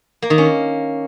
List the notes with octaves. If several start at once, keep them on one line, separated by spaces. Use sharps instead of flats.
A#3
D#3
C#4